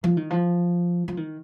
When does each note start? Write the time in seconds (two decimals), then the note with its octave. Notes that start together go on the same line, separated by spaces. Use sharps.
0.04 F3
0.17 D#3
0.30 F3
1.08 F3
1.17 D#3